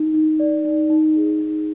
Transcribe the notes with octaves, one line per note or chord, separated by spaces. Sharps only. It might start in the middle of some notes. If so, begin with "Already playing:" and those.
Already playing: D#4
D#4
D5
D#4
D#4
G#4
D#4